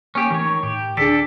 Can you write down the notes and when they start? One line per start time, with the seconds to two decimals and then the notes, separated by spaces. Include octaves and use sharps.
0.15 A#3 C#4 G4
0.30 D#3 E3 A3 C#5
0.63 A2 G4
0.97 C#2 D3 D4 G#4 A4 D5 B6